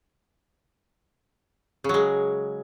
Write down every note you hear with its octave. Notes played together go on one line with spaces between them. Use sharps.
C#3 F#3 G#3